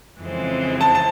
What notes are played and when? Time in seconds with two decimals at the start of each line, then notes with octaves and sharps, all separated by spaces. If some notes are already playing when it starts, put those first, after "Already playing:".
0.21 F2 C#3 E3 G#3 C4
0.81 A5
0.95 A5